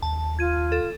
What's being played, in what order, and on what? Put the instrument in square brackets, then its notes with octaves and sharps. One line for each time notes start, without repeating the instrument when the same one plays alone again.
[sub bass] D#2 [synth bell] A5
[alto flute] F4 [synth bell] G#6 D#7
[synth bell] A4